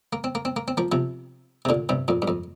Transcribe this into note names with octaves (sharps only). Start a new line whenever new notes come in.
A#3
C4
A#3
C4
A#3
C4
F3 A#3
C3 F3
C3
A#2 D3
G2 C3
F2 A#2
G2
F2